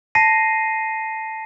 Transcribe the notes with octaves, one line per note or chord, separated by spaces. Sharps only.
A5 A#6 C7 D#7